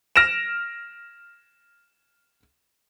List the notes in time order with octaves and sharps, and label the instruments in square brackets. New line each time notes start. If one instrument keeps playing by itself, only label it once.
[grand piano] F6 A#6 D7 E7